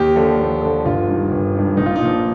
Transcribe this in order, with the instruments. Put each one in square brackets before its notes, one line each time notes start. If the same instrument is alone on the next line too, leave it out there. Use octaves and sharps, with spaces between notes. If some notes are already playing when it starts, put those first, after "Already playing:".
Already playing: [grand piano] D#2 G4
D3 F3
D#2
D3 F3
G1 F4
G2 D#3
G1
G2 D#3
A#1 D#4
F4
D#4
A#2 F3